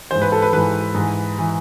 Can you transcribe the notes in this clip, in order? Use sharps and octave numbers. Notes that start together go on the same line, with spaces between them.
G#2 E3 C5
B4
A4
B4
G#2 E3 B4
G#2 E3
E3